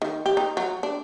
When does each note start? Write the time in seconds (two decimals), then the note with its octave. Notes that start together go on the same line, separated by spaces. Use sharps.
0.02 D#3
0.26 G4
0.37 D#4
0.57 F#3
0.83 D4